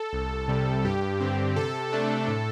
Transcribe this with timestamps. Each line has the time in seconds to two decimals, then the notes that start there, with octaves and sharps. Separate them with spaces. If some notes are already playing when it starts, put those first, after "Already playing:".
Already playing: A4
0.13 C2
0.48 C3 G3
0.85 G2 G4
1.20 D3 C4
1.56 C3 A4
1.93 A3 D4
2.28 A2